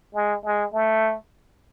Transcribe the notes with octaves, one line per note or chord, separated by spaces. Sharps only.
G#3
G#3
A3